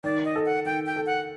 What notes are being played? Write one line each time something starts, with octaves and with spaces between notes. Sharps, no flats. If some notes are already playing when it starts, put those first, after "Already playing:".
D#3 D5
D#5
A4
F#5
D#3 G5
G5
A4
F#5